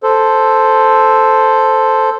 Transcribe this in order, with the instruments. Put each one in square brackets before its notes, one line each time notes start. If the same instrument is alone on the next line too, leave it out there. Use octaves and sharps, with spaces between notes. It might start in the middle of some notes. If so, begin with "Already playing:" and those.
[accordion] A4 C5